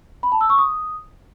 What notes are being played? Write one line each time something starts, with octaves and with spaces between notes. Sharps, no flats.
B5
A5
E6
C#6
D#6